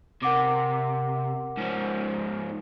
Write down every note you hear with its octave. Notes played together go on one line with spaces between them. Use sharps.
C3 A#4 F#5 D6
G#2 F3